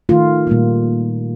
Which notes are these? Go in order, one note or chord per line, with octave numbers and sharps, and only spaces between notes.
D#3 A3 F4
A#2 G3 A#3